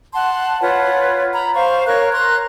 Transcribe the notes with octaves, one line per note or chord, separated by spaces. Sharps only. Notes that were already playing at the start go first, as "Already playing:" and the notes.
F#5 A5 C6
F4 B4 C#5 F#5
A#5 B5
C5 F5 C#6
A#4 C#5 C#6 F#6
A#5 C6 F#6